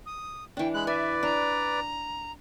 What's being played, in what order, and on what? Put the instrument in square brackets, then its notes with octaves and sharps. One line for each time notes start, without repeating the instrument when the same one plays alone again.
[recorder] D#6
[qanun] E3 D4 [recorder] G5
[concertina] G#3 F#6 [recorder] B5
[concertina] B4 D5 [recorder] E5 [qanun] G#5
[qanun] D4 [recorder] A#5